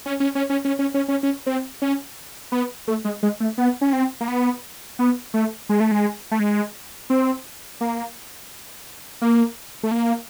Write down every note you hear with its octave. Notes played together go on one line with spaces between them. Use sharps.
C#4
C#4
C#4
C#4
C#4
C#4
C#4
C#4
C#4
C4
C#4
B3
A3
G#3
G#3
A3
B3
C#4
C4
A#3
B3
B3
A3
G#3
A3
G#3
A3
G#3
C4
A#3
A#3
A3
A#3